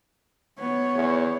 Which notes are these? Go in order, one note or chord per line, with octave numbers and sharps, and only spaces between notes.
B3 C#5
E2